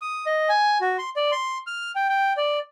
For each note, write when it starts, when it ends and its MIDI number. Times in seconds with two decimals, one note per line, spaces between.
0.02 0.26 87
0.26 0.49 75
0.49 0.78 80
0.81 0.97 66
0.98 1.10 84
1.16 1.31 74
1.32 1.58 84
1.67 1.91 89
1.96 2.09 79
2.09 2.33 79
2.37 2.59 74